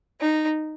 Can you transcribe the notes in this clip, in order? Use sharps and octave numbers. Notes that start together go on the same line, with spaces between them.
D#4